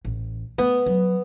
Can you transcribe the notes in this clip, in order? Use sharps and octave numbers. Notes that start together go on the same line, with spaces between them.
A1
A3 B3
F#3